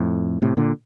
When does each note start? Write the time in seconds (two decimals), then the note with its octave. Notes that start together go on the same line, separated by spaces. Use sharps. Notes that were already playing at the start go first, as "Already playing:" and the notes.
Already playing: F2 A2
0.42 A2 C3
0.57 A#2 D3